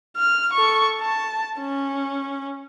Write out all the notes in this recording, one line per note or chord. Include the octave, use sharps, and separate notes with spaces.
F6
A4 C#6
A5
C#4